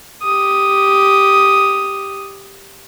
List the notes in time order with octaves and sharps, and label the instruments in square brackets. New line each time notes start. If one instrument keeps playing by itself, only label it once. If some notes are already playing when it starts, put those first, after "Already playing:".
[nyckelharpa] G4 D#6